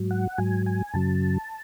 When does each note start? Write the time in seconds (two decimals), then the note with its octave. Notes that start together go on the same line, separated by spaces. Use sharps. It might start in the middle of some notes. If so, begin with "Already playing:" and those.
Already playing: G#2 F#3
0.11 F#5
0.38 G#2 F#3 G#5
0.66 G#5
0.93 F#2 C#3 F#3 A5